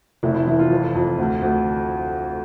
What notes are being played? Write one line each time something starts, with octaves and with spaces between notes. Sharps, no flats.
F1 E4
E4
E3 E4
F4
F2
F2
D2
D2